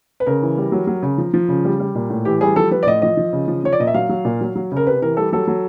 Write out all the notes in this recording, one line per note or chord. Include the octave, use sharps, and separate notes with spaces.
B4
C#3 A#4
E3
G3
F#3
F#3
C#3
F3
F3
C#3
G3
G3
A#2
A2
E3 G4
G3 G#4
F3 A4
F3 B4
D5
A2 D#5
F3 D#5
F3
C#3
F3
F3 C#5
D5
A#2 D#5
E5
F#3 F5
F#3
A#2
F#3
F#3
C#3 A#4
C3 B4
E3 A#4
G3 A4
F#3 A4
F#3